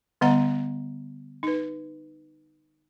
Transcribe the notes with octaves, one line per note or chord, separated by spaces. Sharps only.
D3 G3 B3 D#5 F#5 A#5
D#4 B4